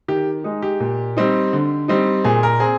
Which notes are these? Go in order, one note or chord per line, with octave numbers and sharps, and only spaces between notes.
D#3 G4
G#3 D#4
G4
A#2
G3 C4 D#4
D3
G3 C4 D#4
A#2 G#4
A#4
C4 G#4